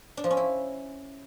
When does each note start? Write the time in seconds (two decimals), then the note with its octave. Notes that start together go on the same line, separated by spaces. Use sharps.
0.17 D4
0.24 F3
0.30 C#4
0.37 E4